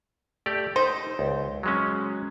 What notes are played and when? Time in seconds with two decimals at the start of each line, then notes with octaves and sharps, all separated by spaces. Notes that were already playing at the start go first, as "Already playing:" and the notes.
0.46 A3 G4 D5
0.76 D#4 C5
1.19 C#2
1.63 F#3 G#3 C#4